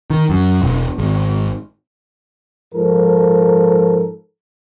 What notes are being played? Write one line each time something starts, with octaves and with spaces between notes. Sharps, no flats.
D#3
F#2
E1
G#1
G#2 F3 A4 A#4